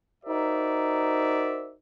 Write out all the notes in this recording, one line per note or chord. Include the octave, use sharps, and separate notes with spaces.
D#4 F#4 A#4 C5 D5 E5